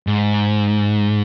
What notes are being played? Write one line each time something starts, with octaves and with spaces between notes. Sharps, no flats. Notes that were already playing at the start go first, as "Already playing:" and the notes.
G#2